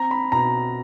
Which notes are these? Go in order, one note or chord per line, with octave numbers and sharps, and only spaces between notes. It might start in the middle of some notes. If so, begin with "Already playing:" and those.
Already playing: C4 A#5
B5
B2 A#5